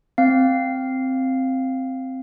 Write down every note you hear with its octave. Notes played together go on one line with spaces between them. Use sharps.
C4 F5